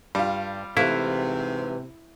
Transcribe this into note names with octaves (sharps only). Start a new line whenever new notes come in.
G2 G3 F4
G#2 C3 E3 A3 E4 F5